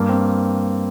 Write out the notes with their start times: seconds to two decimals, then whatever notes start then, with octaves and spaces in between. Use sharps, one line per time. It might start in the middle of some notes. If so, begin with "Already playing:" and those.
Already playing: G2 A#3
0.09 C4